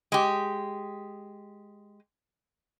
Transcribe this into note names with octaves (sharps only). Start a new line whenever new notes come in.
G#3 G4